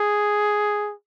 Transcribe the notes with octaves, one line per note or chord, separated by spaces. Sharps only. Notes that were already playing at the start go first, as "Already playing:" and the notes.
Already playing: G#4